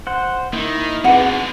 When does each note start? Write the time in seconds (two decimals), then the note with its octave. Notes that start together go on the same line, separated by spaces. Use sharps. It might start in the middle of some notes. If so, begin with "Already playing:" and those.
0.07 C5 F#5
0.53 D#3 A#3 D#4 E4
1.04 B2 D3 C4 G#4 B4 F#5